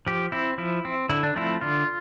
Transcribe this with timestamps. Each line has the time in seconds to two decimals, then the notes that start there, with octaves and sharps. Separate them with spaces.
0.07 F3 G4
0.32 C4 E4
0.58 F3 E4
0.85 C4
1.09 D3 E4
1.23 D4
1.36 F3 A3 C4 E4
1.61 D3 F4